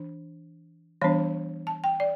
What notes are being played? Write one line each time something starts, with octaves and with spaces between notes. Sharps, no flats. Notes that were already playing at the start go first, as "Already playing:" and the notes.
Already playing: E3 D4
E3 G3 B3 D4 C#5
A5
G5
D5